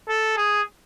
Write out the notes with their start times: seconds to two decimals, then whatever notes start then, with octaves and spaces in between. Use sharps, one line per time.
0.09 A4
0.37 G#4